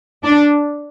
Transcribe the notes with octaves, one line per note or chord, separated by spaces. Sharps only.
D4